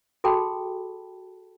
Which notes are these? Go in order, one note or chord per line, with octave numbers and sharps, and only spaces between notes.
F#4 G#4 A4 G5 A5 B5